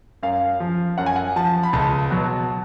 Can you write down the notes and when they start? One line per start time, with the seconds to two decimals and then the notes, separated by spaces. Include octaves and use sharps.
0.23 F#2 F5
0.60 F3
0.98 F#2 F#5
1.06 G#5
1.16 F#5
1.36 F3 A5
1.63 B5
1.73 C#2 A5
2.10 B2 F#3